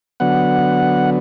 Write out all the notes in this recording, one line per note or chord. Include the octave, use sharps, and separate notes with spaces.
D3 F#3 B3 F#5